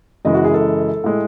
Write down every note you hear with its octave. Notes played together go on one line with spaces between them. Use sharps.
F#2 C#3 E3 G#3 D#5
F#4
G#4
A4
A2 G#3